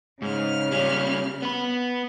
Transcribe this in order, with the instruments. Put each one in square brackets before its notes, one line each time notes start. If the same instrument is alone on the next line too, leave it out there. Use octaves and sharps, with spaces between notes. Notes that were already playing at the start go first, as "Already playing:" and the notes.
[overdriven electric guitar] G#2 [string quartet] C#3 F6
[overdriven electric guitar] G3 C#4
B3 B5